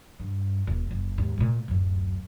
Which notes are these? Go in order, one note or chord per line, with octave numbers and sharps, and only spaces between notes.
G2
D#1
F#1
D#2 G#2
A#2 A3
D1 F#2